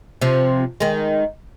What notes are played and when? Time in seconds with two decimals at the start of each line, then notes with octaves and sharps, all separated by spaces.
0.21 C3 F3
0.80 D#3 G#3